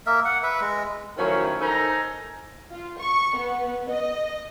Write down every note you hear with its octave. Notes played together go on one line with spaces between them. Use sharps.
A#3 A#4 E5
F#5
B4 E5
G#3
D#3 F3 F#3 A3 C#4 E4
D#4 A4 A#4 C5 G#5 A#5
F4
C#6
B3
D#5